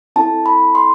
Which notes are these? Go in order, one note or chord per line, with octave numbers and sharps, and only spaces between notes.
C4 E4 A4 A5
B5
C6